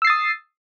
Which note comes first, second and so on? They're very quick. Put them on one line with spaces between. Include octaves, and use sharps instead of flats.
E6 C7 A6 D#6